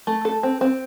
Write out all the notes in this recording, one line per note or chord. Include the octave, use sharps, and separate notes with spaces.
A3
A4
C4
C4